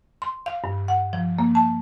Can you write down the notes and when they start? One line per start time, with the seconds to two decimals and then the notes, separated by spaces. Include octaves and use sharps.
0.22 C6
0.46 F5
0.64 G2
0.88 F#5
1.13 F3
1.39 A#3
1.55 A5